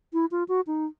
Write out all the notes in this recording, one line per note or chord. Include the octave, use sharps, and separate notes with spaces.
E4
F4
F#4
D#4